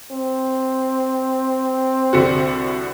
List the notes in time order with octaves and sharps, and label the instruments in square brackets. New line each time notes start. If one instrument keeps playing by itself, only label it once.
[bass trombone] C4
[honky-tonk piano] C2 D3 F#4